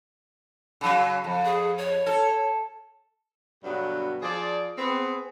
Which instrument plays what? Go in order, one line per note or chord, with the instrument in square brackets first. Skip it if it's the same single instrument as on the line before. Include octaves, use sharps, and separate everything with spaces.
[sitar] C#3 F#3
F2
[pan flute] G#4
C#5
[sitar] A4
[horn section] G2 B2 D3 F#3 B3 F#4
F3 G#4 D5
B3 C4 G#4